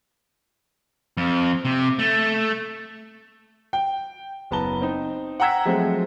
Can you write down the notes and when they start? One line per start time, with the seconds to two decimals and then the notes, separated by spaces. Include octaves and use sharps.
1.17 F2
1.65 C3
1.99 A3
3.73 G5
4.51 F#1 B3 A5 A#5 G7
4.82 C4 D#4
5.40 F#5 G5 A#5 E6 G#6 B6
5.65 F3 F#3 G#3 A3 C4 F#4